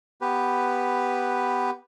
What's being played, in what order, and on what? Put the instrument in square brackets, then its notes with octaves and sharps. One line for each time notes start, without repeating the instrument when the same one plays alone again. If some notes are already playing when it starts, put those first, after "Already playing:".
[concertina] B3 G4 B4